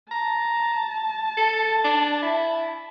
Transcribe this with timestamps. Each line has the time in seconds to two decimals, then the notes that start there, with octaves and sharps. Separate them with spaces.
0.11 A5 A#5
1.37 A4
1.84 D4
2.22 E4